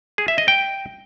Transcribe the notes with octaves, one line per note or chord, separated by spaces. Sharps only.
G#4
E5
D#5
G5